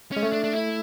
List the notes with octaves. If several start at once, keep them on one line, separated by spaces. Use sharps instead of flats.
G#3 C#4
A3
D4
D4
E4